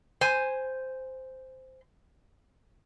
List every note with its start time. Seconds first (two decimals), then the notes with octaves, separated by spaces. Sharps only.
0.21 C5 G#5